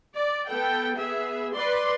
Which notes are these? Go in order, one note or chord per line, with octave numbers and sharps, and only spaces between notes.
D5
B3 A4 G5
B3 G#4 E5
B4 D5 C6